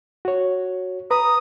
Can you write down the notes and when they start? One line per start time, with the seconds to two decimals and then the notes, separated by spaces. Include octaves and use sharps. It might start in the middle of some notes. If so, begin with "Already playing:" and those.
0.25 F#4 C#5
1.11 B4 A#5 D#6